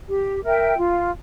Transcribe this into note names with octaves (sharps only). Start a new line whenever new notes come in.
G4
A#4 E5 G5
F4